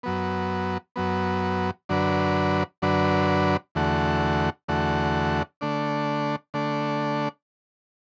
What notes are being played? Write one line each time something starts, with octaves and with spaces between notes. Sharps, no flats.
F#2 F#3 B3
F#2 F#3 B3
F#2 D3 F#3 D4 B4
F#2 D3 F#3 D4 B4
E2 D3 A3 F#4
E2 D3 A3 F#4
D3 A3 D4
D3 A3 D4